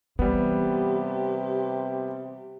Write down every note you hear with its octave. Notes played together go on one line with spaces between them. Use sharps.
C3 E3 G3 B3 G4